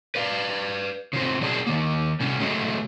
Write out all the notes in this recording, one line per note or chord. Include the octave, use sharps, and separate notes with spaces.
B4 D5 F5
C#3 F3 C4
F#3 D4 G4 G#4
D#3 A#3
C3 G3 C#4
C#3 F#3 G#3 A3